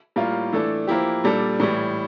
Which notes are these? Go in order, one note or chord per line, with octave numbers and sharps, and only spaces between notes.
A2 G3 A#3 F4
E3 A3 D4 A4
F3 A#3 E4 G4
A#2 G3 D4 A4
A2 E3 G3